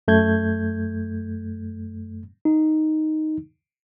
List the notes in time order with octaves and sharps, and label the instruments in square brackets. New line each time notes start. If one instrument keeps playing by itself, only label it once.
[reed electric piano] F#2 A3 G6 G#6
[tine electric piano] D#4